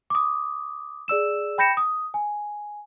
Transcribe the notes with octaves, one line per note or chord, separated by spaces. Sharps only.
D6 D#6
G#4 D5 E6 E7
G5 B5 G6 A#6 C#7 E7
D#6
G#5